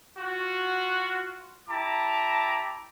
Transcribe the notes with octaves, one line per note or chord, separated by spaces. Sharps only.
F4 F#4
E4 G4 A5 A#5 D6